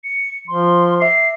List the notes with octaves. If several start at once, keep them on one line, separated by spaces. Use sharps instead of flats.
C#7
F3 C6
E5 D6 C7